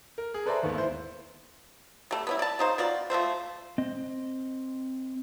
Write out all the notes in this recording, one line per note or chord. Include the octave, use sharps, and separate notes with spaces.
A#4
G#4
A4 B4 C5 D5 E5 A#5
D#2 G#2 A3 B3
E4 C5
G3 A3
B3 C#4 E4
D5 A5
C#3 D#4 C5
B3 F4 F#4 D5
F3 F#3 A3 C5
C4 D#5